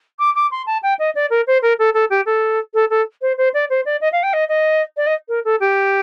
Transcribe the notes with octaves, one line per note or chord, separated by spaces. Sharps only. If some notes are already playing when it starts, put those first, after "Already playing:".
D6
D6
C6
A5
G5
D#5
D5
A#4
C5
A#4
A4
A4
G4
A4
A4
A4
C5
C5
D5
C5
D5
D#5
F5
G5
D#5
D#5
D5
D#5
A#4
A4
G4